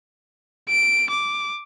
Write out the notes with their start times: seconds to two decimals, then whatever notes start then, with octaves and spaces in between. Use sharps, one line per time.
0.69 D7
1.10 D6